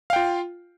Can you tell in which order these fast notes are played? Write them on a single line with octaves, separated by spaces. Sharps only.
F5 G5 F4